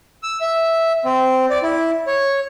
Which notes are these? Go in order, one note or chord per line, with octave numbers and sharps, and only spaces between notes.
E6
E5
C4
D5
E4
C#5